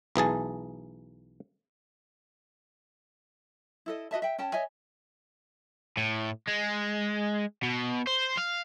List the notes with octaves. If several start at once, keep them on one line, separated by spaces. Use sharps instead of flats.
B1 E3 G#4 A5
E4 A4 D#5
F#4 D#5 E5 A5
E5 G5
C#4 G5 A5
C#5 D#5 E5 G#5
A2
G#3
B2
C5
F5